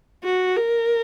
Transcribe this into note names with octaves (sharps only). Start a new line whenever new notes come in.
F#4
A#4